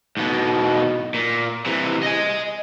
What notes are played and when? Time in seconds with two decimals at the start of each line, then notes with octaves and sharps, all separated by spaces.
0.17 G#2 B2
1.14 A#2
1.66 C3 E3
2.03 D#5 G#5